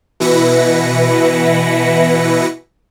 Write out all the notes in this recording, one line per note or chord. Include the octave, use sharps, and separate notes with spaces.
B2 E3 E4 B4 A#6 C#7